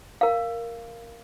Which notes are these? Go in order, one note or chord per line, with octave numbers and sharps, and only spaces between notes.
A#4 F5